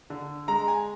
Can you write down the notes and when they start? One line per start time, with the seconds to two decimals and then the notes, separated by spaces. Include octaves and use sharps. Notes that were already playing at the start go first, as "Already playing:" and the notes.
0.10 D3
0.48 G#3 A#5
0.68 G#5